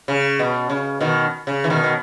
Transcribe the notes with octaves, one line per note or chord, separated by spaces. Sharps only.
C#3
B2
C#3
B2 D#3
C#3
E3
B2 D#3
B2